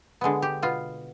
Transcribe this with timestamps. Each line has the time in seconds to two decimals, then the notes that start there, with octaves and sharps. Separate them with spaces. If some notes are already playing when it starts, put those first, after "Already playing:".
0.21 D3 G#3 B3
0.42 G4
0.62 B2 B3 F4